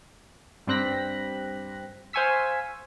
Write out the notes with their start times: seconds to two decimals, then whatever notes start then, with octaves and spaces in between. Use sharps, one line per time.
0.67 G2 G3 C4 F#6 A#6 B6
2.13 C5 F5 G#5 C#6 E6 B6